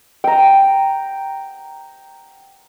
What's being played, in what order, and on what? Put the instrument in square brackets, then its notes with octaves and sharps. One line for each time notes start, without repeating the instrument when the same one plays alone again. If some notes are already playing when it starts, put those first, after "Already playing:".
[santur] G5 A#5